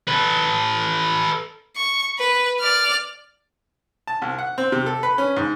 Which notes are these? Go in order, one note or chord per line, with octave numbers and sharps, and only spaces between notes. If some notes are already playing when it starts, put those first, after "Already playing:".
A4 B4
C#6
B4
D5 F6
A5
C2
F#5
C4
C3
A4
B4
C#4
G#2